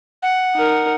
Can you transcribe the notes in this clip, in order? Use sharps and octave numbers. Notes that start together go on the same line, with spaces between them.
F#5
D#4 A#4